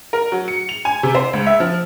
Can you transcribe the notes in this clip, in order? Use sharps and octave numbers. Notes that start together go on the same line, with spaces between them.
A#4
F#3
C#7
F7
G#5
C3
C5
C#2
E5
F3